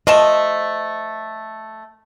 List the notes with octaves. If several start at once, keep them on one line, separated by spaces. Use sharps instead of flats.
F3 A3 D#5 A5